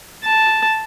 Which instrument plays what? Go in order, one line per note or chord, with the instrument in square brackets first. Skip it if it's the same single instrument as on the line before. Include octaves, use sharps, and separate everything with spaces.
[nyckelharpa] A5